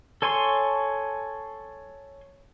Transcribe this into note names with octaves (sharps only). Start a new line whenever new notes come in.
A4 C#5 G#5 C6 C#6